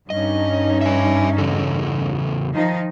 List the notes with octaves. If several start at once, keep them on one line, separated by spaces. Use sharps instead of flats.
G2 C#4 D#4 D#5
E5 G#5
E2 C#3 A4
D#3 F3 D#4